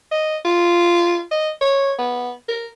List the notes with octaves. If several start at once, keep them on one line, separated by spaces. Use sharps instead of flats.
D#5
F4
D#5
C#5
B3
A#4